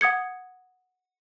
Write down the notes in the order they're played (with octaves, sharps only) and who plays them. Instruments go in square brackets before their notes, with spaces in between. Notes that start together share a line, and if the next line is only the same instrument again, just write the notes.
[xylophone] F#5 D#6 G#6 C#7